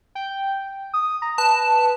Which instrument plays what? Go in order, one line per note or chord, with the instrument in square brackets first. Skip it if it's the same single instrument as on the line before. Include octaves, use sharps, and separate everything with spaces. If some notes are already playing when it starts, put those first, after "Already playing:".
[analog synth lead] G5
D#6
A#5
[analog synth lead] B4 [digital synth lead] A5